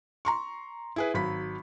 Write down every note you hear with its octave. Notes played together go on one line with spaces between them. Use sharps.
A#5 C6 C#6
E4 G#4 B4
G#1 F#3 B5 B6